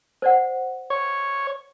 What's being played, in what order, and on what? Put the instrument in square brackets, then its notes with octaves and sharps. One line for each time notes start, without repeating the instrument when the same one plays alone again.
[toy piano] C5 D5 F#5
[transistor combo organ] C#5